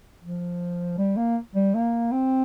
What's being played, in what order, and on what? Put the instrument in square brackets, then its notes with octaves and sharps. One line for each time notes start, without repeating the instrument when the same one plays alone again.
[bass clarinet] F3
G3
A#3
G3
A#3
C4